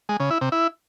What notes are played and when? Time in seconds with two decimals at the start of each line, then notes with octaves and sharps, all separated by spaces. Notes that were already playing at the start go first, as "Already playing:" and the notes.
0.09 G#3
0.20 C#3
0.31 E4
0.41 C3
0.52 E4